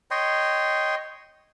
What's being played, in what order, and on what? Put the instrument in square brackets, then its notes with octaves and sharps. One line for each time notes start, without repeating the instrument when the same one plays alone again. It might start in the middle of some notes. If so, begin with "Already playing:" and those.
[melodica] C#5 D#5 G5 C6